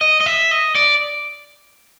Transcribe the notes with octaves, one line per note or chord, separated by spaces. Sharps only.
D#5
D#5
E5
D#5
D5